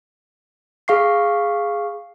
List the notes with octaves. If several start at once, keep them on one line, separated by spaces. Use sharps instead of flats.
G#4 F5 C#6 C7